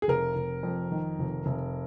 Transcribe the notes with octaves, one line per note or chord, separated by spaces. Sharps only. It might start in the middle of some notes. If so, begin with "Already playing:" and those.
G#4
F1 A#4
F1
F2
D#3
F1
F1